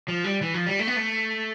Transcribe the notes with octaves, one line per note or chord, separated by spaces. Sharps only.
F3
G3
E3
F3
G3
A3
B3
A3